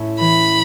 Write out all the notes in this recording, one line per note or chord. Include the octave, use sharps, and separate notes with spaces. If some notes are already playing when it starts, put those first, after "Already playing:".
Already playing: A2 A3 C#4 E4
E3 B5